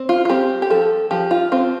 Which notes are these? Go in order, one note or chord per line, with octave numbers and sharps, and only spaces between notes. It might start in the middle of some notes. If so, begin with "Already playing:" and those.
Already playing: C4
F4
F4
C4 G4
G4
F3 A4
F3 G4
F4
C4 F4